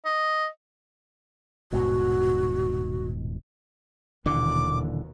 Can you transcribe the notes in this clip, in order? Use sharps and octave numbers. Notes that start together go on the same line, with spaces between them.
D#5
D#1 G#2 B2 F#4
D#1 D#2 B2 D3 E3 D6